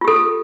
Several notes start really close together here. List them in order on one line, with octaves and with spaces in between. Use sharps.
F4 G4 A4